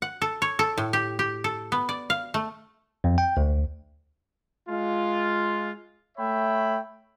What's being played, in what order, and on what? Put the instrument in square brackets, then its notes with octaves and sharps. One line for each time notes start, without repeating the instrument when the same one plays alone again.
[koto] F#5
A4
C#5
A4
A2
G4
G4
A4
B3
D5
F5
A3
[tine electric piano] F2
G5
D2
[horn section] G#3 F4
A3 C#5 E5 G5 B5